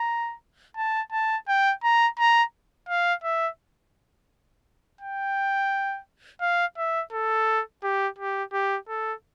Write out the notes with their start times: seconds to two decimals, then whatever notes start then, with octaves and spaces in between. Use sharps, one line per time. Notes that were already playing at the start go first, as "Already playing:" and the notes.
Already playing: A#5
0.77 A5
1.12 A5
1.49 G5
1.84 A#5
2.19 A#5
2.89 F5
3.24 E5
5.01 G5
6.41 F5
6.78 E5
7.12 A4
7.84 G4
8.19 G4
8.53 G4
8.89 A4